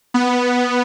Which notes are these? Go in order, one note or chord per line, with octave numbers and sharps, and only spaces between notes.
B3